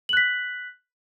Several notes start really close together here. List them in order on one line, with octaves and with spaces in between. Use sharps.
F#7 F#6 B6